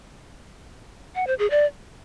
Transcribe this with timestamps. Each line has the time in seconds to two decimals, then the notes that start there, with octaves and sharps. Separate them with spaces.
1.15 F#5
1.27 C5
1.39 G#4
1.51 D5